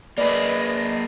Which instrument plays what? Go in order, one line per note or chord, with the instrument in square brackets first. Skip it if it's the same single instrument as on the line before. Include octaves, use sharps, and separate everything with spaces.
[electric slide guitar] A#3 G#4 [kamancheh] B4 [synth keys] D5 [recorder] D#5